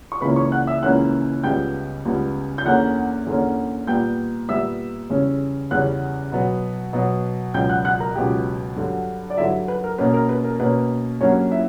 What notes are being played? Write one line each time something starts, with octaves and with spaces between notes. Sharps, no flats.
C#6
C#2 C#3 E3 A#3 C#4 B4 B5
C#5 C#6
F#5 F#6
E5 E6
C#2 C#3 E3 A#3 C#4 F#5 F#6
C#2 C#3 G3 B3 G5 G6
C#2 C#3 G3 B3
G6
E2 D3 A#3 C#4 F#5 F#6
E2 D3 A#3 C#4
A#2 G3 B3 G5 G6
A#2 G3 B3 E5 E6
E2 C#3 G3 C#4
E2 C#3 G3 C#4 F#5 F#6
B2 F#3 B3
B2 F#3 B3
C#2 B2 F#3 G5 G6
F#5 F#6
F#5 F#6
A#4 A#5
C#2 B2 F#3 G4 G5
G2 D3 F#3
D5
G2 D3 F#3 E4 E5
B4
A#4
B2 A#3 C#4 B4
A#4
B4
A#4
B2 A#3 C#4 B4
G2 F#3 A#3 C#4 C#5
E4 E5